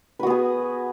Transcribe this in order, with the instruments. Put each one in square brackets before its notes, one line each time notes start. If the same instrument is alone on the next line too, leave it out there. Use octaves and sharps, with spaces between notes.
[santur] B4
F#4
B3
G#4